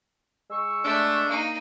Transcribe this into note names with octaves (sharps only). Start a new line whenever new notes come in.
G#3 C#6 E6
A3 D4
A#3 D#4